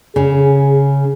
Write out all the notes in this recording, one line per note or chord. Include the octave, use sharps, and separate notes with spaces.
C#3 G#4